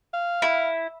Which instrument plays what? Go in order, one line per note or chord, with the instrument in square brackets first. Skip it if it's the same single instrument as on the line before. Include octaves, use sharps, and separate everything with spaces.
[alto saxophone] F5
[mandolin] E4